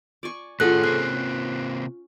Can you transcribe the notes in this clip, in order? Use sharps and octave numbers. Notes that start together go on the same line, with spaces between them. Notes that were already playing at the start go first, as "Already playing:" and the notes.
D5 G#5 C#6
A2 D#3 C#4 F4 G#4 A4 F#5 F#6
C3 A#3 C4 G#5 F#6